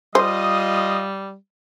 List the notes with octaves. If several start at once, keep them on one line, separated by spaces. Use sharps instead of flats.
G3 F4 C5 D#5 F5 D#6